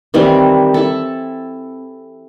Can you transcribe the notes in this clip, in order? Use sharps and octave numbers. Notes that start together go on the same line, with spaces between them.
D#3 E3 G3 C4
E4 A4